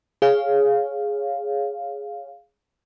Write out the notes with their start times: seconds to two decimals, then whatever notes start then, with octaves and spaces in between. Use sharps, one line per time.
0.22 G#4 C#5 F5